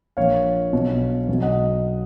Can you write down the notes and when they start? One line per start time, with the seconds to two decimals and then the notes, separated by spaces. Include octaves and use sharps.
0.17 A#1 A#2 F3 C#5 F5
0.73 B1 B2 F#3
1.29 B1 B2 F#3
1.42 D#5 F#5